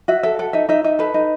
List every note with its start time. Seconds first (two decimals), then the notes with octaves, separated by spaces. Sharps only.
0.08 F#4 E5
0.23 A4 E5
0.39 A4 F#5
0.53 D#4 E5
0.69 D#4 E5
0.84 D#4 E5
0.99 A4 B4
1.14 D#4